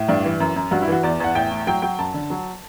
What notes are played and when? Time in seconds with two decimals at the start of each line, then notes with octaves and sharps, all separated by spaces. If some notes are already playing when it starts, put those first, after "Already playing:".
Already playing: A2
0.08 G2 D4
0.24 E3
0.40 F#2
0.56 F#2
0.71 G2 F#4
0.82 E4
0.88 E3 F#4
1.03 E2 D5
1.20 E2 F#5
1.35 A2 G5
1.51 A2
1.67 F#3 G5
1.82 F#3 G5
1.98 F#2 A5
2.14 D3
2.30 F#3